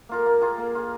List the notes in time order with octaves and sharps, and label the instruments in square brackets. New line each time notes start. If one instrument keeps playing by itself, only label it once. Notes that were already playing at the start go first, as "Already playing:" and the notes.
[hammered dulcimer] A#3 F4 A#4
A#3
F4 G#4
A#3
F4 G#4